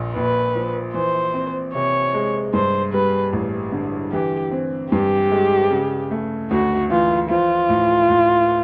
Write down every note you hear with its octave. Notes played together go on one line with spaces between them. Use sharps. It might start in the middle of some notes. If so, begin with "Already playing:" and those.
Already playing: A#1 A#2
A#1 B4
F3
E3 C5
C4
C3 C#5
G#3
G2 C5
G3 B4
A1
D3
E3 G4
C4
G2 G4
G#3
C#3
A3
D2 F#4
E3 F4
F3 F4
A2
A2